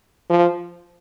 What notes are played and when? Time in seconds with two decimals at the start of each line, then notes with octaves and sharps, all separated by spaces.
0.30 F3